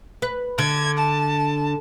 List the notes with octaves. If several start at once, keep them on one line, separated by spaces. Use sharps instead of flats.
B4
D3 G#6
A5